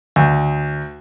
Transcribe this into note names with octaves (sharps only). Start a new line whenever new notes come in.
D2